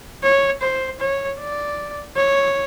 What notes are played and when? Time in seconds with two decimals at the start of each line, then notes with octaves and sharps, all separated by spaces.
0.23 C#5
0.62 C5
1.00 C#5
1.39 D5
2.16 C#5